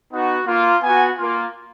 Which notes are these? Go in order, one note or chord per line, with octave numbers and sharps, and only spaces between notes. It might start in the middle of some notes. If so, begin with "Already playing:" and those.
B3 D#4 F#4
A#3 F4
B3 F#4 G#5
A#3 F4